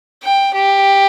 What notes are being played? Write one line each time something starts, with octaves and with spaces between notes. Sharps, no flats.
G5
G4